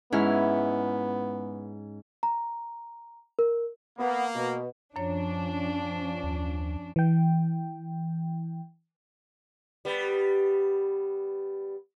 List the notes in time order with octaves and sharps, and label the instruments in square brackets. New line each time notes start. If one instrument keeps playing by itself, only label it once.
[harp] G#2 C#4 F6 [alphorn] B3 [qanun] E4
[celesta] A#5
A#4
[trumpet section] A#3 [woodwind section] B3
[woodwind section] B2
[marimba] F#2 C#5 [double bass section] F3 C#4 [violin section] D4
[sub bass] D#2
[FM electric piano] E3 G5
[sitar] G3 B3